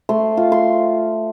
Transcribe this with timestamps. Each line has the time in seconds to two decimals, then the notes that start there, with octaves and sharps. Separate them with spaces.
0.09 A3 C6
0.37 F4
0.52 C6